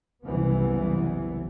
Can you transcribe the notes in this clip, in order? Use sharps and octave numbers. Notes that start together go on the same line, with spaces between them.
F#1 C2 E3 B3